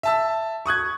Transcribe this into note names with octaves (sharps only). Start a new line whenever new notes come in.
E5 A5 E6
C#6 D#6 F#6 G#6